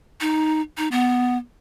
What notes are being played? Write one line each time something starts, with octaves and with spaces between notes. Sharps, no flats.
D#4
D#4
B3